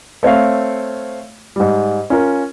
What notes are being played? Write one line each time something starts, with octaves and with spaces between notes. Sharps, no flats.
A3 C4 C#5 F5
G#2 G3
C#4 F4 A#4